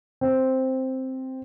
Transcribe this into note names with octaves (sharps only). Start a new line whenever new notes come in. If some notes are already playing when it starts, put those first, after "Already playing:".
C4